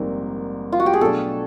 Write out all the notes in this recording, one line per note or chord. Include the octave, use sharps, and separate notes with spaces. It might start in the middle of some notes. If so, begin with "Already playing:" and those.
Already playing: A#1 G#2 D#3 G3 C4 A#4
F4
F#4
G4
G#4
B2 F#3 A3 D4 A4